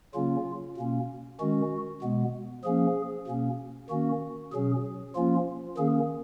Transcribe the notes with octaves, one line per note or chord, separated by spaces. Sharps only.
C#3 F#3 A#3 C#4 F4
B2 A#3 C#4
D#3 G#3 C#4 F#4
B2 G#3 B3
F3 A#3 C#4 G#4
B2 A#3 C#4
D#3 A#3 C#4 F#4
B2 F#3 C#4 G#4
F3 A#3 C#4 F4
D#3 A#3 C#4 G#4